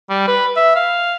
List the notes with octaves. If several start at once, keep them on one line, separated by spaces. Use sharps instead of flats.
G3
B4
E5
F5